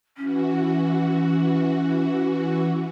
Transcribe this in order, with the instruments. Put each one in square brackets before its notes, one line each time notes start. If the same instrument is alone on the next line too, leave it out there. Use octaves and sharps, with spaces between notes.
[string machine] E3 F#4 [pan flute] C#4